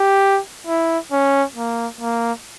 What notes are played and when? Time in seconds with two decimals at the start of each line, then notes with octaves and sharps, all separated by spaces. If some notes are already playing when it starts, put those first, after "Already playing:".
Already playing: G4
0.67 E4
1.12 C#4
1.56 A#3
2.01 A#3